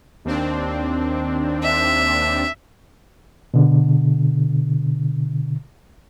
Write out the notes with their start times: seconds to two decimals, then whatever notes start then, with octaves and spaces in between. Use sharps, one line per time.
0.25 D#2 C4 D4
1.63 E5
3.54 B2 D3